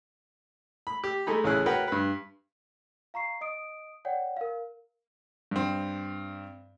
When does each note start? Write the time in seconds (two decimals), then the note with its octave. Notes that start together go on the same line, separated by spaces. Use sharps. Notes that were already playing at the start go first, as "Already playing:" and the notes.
0.87 B5
1.04 G4
1.27 G#3 A3 D#4 B5
1.44 A1 C#3 C#4 E4 G#4 F#6
1.66 F#4 A#4 B4 C#5 F#5 G5
1.88 G2 B4
3.14 F5 A#5 C#6 C7
3.41 D#5 D#6 D7
4.05 C#5 D5 F#5 G5
4.37 A#4 F5
5.51 G2 C4